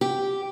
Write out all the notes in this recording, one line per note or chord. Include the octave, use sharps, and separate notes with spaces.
G4